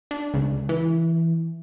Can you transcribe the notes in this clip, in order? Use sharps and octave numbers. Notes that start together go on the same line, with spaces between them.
D4
C#2
E3